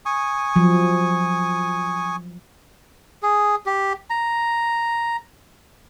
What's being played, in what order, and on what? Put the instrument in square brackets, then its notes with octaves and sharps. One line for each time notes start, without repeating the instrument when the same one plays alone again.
[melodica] G#5 C#6 D#6
[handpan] F3 F#3
[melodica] G#4
G4
A#5